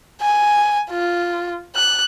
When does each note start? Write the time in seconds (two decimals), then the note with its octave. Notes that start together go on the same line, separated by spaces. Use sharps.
0.22 G#5
0.90 F4
1.76 F#6